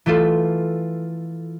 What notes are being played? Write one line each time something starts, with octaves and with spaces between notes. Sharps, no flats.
E3 A3 F4 A4